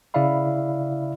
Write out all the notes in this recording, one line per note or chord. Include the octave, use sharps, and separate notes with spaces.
C#3 E4 D5 E5 F5 B5